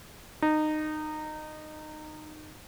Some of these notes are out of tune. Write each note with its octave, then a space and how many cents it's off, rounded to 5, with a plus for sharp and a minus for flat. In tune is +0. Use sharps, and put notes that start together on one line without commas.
D#4 -20